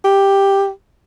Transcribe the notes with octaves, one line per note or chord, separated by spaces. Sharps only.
G4